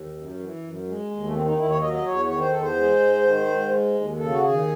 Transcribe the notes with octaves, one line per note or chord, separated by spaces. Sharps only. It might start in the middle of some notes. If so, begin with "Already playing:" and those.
Already playing: D#2
F#2
E3
F#2
G#3
D#2
A3
D#3 C4
D#4
D#2 E4
C#5
F#3 D#5
D#5
E2 C#5
D#3 C#5
C5
E2 A4
C5
G#3
G#2
D#3
G#2
G#3
D#2
C#3 A4
F#4
D#2 G#4